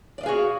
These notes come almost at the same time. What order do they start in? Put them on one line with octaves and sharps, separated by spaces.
D5 D#5 F5 G#4 F#4